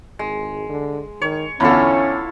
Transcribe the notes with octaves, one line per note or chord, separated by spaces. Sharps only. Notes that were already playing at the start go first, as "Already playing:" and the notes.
G#1 G#3
D3
D#3 C#5
E2 D3 C#4 E4 F4 A4